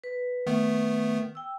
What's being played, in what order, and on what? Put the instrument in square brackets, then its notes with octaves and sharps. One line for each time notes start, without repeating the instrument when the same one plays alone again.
[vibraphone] B4
[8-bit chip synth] D#3 A3 B3
[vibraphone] G5 E6